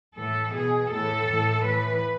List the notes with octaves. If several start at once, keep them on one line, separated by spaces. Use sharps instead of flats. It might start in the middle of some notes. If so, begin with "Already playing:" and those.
A2 E3 A4
B2 G#4
A2 E3 A4
A2 E3
A2 E3 B4